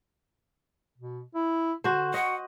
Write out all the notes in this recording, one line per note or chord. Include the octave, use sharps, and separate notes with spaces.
B2
E4
D3 F#4 C5
F#4 D#5 F#5